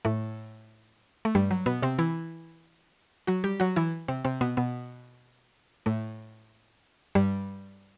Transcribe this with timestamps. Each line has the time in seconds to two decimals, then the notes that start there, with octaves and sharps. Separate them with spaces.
0.05 A2 A3
1.25 A3
1.35 G2 G3
1.51 F#3
1.66 B2 B3
1.83 C3 C4
1.99 E3 E4
3.27 F#3 F#4
3.44 G3 G4
3.60 F#3 F#4
3.76 E3 E4
4.08 C3 C4
4.25 C3 C4
4.41 B2 B3
4.57 B2 B3
5.86 A2 A3
7.15 G2 G3